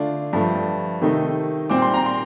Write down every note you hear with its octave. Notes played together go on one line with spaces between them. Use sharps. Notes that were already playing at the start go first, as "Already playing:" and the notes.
Already playing: D3 A3 D4 F4
G2 F3 A3
C3 D#3 A3 D#4
A#2 G3 C4 D6
C6
A#5
C6